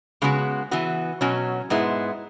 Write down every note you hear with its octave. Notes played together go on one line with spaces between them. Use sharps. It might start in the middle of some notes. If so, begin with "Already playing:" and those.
C#3 G#3 B3 F#4
E3 B3 F#4
B2 F#3 C#4 F#4
G#2 G#3 B3 E4